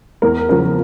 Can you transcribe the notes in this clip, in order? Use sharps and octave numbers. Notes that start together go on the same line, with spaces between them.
E2 A#4
C#3 F3 A#4